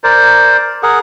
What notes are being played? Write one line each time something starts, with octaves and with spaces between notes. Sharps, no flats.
A#4 C5 D5
G#4 A#4 F#5